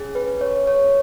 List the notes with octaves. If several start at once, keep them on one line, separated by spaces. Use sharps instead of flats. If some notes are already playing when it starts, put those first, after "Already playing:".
Already playing: C#4 G#4
B4
C#5
C#5